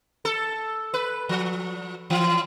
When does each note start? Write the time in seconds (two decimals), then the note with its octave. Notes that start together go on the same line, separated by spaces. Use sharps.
0.25 A4
0.94 B4
1.29 F3
2.10 E3